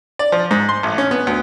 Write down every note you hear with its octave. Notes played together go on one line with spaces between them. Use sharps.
D5
F3
G#2
C6
A1
C#4
B3
D2